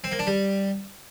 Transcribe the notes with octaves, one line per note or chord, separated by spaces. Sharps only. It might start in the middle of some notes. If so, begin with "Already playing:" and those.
C4
A#3
D4
G3